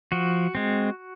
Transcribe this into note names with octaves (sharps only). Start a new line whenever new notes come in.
F3 F#4
G#3 C4